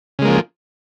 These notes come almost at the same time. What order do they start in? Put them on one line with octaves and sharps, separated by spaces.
C#3 G#3 A#3 F3